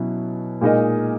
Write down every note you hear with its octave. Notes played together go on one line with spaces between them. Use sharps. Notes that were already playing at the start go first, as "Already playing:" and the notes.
Already playing: B2 F#3 C#4 E4
A#2 G#3 D#4 A#4 D#5